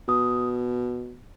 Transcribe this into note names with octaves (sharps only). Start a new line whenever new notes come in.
B2 D#6